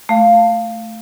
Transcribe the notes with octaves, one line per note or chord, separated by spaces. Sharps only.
A3 F5